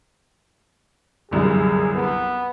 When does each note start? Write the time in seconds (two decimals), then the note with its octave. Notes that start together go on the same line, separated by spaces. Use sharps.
1.31 G1 C2 F#2 G#4
1.94 B3